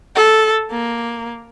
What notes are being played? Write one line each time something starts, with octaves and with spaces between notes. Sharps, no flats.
A4
A#3